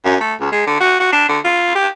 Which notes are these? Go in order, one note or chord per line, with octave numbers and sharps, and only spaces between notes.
F#2
A3
C#2
G#3
D3
F#4
F#4
D4
D3
F4
G4